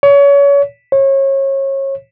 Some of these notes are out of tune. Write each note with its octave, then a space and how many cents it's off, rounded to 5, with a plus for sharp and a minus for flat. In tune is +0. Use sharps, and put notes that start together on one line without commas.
C#5 +30
C#5 -30